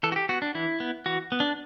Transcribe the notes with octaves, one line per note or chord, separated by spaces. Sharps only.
E3 A4
F#4
G4
B3 F#4
D4
E3 E4
B3
E3 F#4
B3
D4